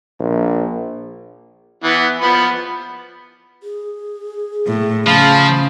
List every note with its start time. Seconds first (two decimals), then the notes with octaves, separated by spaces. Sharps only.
0.20 A#1
1.84 E3 B3
2.22 F3 B3 B5
3.63 G#4
4.66 A2
5.07 C#3 F3 F5 A5 B5